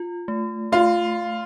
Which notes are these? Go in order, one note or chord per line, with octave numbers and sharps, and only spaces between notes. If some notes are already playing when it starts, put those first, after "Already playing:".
Already playing: F4
A3
A3 F4